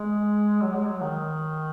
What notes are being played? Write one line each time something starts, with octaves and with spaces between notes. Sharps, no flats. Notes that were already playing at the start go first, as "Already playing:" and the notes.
Already playing: G#3
F#3
G#3
F#3
D#3